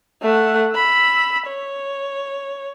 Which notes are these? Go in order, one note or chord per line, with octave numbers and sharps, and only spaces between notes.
A3 F#5
B5 E6
C#5